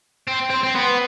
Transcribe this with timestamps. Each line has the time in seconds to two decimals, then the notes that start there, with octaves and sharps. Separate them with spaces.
0.27 C4
0.50 C4
0.63 C4
0.75 B3